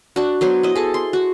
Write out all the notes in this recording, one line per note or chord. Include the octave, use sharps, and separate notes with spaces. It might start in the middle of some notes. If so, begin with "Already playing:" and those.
D4 F#4
F#3 B3 C5
E4 D#5
G#4 A4
C6
F#4